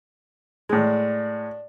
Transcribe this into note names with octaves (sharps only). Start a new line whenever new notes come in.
A2 G#3 D4